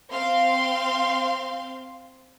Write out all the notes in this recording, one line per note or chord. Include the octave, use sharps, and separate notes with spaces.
C4 F5 C6